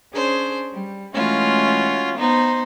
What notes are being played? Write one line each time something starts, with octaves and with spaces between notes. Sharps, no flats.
C#4 D4 G#4 C5 C#5
G3
E3 G#3 A3 C#4 F4 F#4
B3 D#4 C5